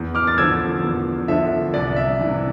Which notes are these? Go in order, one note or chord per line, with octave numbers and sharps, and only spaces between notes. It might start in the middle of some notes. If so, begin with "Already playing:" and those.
Already playing: E2
D6 F6
A6
D3 F3 E6 G#6
E2
D3 F3 E5
C2 D5
E5
C3 E3